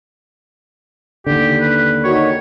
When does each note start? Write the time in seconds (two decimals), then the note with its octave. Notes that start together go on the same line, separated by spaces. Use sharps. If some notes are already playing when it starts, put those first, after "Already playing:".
1.27 D#2 D3 G4
1.60 B4
2.04 D#3 F#4 C#5